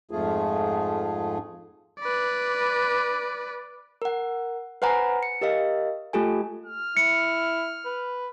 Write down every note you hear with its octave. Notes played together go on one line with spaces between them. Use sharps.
F2 G#2 F3 A3 F4 G#4
B4 D5
A#4 F#5
B4 C5 F#5 G#5 A#5 B5
C#7
G4 A#4 D#5 F5
A3 F4 G4 A4 G#5
F6
E4 C#7
B4